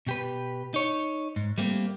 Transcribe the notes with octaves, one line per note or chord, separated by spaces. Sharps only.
B2 G4 B4
D#4 C#5
G#2
G3 A3 A#3 C4